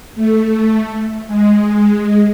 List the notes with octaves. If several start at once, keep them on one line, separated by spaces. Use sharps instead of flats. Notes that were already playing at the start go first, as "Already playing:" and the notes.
A3
G#3